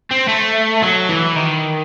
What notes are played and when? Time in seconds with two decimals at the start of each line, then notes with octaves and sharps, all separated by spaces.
0.11 C4
0.29 A3
0.82 F#3
1.09 E3
1.36 D#3